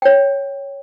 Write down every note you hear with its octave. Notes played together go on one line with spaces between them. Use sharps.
C#5 G5